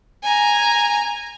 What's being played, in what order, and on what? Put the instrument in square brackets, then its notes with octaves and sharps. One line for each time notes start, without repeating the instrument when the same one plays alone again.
[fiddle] G#5 A#5